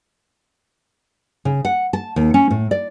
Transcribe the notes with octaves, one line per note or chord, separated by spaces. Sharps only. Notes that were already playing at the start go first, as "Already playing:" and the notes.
C#3
F#5
A5
D#2
C#4
A2
D5